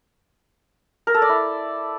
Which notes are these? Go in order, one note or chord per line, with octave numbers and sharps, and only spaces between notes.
A#4
A4
D5
E4